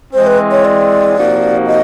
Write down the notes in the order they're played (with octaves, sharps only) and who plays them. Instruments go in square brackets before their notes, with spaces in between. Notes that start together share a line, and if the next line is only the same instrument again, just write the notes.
[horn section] E3 G#3 C4 [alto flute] C5
[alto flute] B4
C#5
D5
[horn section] C3 F3 A#3 D#4 F#4
[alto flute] D#5